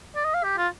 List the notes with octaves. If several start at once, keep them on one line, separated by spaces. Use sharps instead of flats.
D5
D#5
F5
G4
F4